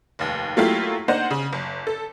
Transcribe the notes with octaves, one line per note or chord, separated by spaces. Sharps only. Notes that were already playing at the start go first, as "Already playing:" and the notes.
F1 D#2
F#3 A3 A#3 E4 F4 G4
A#3 D4 D#4 C5 F#5
C#3
F#1
A4